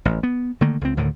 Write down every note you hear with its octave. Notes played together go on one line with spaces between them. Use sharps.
A1
B3
D3 D#3 A3 A#3
C#2 C4
D2 A2 D3 D#3